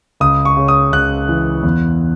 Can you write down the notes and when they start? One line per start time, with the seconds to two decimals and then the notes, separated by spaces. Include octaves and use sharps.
0.20 C#2 D#6
0.45 C#6
0.57 C#3
0.68 D#6
0.92 C#2 F#6
1.29 E3
1.64 E2